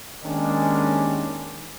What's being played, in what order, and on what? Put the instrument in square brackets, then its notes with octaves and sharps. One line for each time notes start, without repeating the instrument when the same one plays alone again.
[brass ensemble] D#2 D#3 G#3 C#4 D4